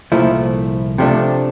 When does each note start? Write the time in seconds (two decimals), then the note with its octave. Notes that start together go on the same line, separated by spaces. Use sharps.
0.12 C2 A#2 F3 A3 E4
0.98 C3 F3 A3 D4